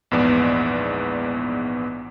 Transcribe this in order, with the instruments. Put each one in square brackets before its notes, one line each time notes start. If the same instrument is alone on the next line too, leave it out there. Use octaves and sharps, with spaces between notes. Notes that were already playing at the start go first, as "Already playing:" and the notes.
[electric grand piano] A#1 E2 G#2 B3 D5 E7